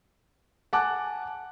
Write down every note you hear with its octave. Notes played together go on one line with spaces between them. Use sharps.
F#5 G#5 A5 D6 F#6